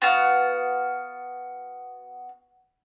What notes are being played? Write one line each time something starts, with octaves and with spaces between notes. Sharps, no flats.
B3 F#4 F5